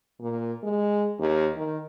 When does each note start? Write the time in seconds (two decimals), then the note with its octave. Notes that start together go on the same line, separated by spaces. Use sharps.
0.21 A#2
0.63 G#3
1.20 D#2
1.56 D#3